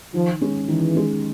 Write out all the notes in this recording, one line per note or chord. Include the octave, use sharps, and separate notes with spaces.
D#3 F3
G#3 C#4
D#3 E3
G#3 C#4